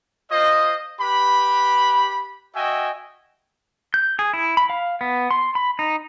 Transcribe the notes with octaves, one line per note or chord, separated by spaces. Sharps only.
F4 C5 D#5
G4 B4 B5
F#4 D#5 E5 G5 G#5
G6
G#4
E4
B5
F5
B3
C6
B5
D#4